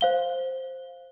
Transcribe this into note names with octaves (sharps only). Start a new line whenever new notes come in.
C5 F5 G7